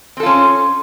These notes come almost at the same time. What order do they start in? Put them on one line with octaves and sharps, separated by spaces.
C4 A4 F4 C#4